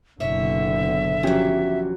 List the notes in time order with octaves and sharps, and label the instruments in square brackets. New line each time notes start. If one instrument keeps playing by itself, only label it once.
[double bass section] F#1 B2 D3 [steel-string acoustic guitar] C#5 [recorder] E5
[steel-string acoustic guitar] E2 F#3 [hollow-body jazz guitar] F3 C#4 G4